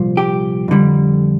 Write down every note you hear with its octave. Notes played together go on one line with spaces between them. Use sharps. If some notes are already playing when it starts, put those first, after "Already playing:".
Already playing: C2 A#2 F3
G4
F2 D3 G3